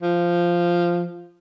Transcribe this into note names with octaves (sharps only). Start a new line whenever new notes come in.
F3